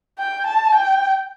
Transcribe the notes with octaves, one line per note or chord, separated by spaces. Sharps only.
G5
A5
G5